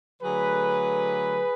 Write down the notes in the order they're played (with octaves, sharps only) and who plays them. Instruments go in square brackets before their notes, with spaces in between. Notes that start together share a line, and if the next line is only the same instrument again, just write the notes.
[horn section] D3 F#3 A3 G#4 B4